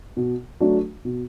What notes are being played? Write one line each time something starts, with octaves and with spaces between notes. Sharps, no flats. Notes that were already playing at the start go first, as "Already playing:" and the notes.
B2
F#3 A3 D4 F#4
B2